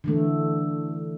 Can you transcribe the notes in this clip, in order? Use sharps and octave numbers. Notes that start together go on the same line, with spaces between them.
D3 E3 A3